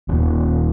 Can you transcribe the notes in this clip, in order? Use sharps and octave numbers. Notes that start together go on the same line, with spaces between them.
D#1